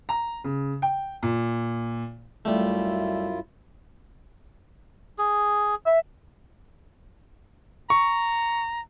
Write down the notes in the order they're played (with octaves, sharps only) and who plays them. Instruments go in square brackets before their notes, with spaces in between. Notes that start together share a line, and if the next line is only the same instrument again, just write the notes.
[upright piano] A#5
C#3
G5
A#2
[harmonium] F#2 E4 F4 [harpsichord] G3 A3
[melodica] G#4
[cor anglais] E5
[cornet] A#5 [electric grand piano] C#6